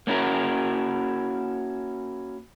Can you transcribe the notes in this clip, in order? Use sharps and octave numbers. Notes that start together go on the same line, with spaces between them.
A#3 C#4 E4 F#4 A#4